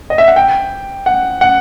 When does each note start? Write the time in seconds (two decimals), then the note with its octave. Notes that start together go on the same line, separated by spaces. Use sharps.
0.10 D#5
0.18 E5
0.28 F#5
0.36 G5
1.06 F#5
1.41 F#5